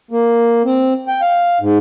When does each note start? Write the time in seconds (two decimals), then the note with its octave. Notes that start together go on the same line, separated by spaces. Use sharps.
0.11 A#3
0.64 C4
1.08 G5
1.22 F5
1.60 G#2